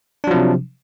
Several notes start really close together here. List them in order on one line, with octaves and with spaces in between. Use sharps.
D4 F#3 F3 C3